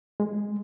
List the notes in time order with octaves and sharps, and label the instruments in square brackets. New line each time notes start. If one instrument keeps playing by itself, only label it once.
[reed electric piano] G#3